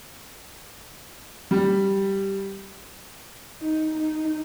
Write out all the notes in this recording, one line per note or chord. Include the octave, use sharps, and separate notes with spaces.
G3
D#4
D#4